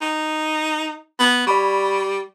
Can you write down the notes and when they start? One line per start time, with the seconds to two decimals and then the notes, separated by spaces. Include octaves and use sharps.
0.02 D#4
1.20 B3
1.47 G3 D5 B5 C#6